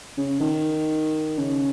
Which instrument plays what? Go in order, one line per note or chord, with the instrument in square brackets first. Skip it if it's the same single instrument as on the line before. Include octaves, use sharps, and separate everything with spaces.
[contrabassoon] C#3
D#3
C#3